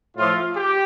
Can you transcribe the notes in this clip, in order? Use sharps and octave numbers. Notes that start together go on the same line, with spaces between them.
A2 F3 A3 F4
G4